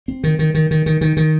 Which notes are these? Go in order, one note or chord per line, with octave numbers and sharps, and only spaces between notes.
C4
D#3
D#3
D#3
D#3
D#3
D#3
D#3